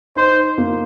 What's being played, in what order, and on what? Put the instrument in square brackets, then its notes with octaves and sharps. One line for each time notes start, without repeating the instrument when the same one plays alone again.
[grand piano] D#4 [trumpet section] C5
[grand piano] A#3